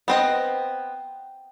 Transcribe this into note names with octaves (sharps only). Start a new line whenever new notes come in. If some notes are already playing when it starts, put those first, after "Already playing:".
B3 C4 D#5 F#5 G5